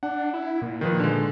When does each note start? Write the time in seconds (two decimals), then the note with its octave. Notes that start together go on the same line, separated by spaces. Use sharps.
0.03 D4 F#5
0.33 E4
0.62 A#2
0.81 D#3 F3 B4
1.00 D3 G#3